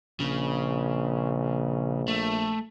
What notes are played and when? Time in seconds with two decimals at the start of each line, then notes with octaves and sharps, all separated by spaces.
0.20 A#1 C#3
2.08 A3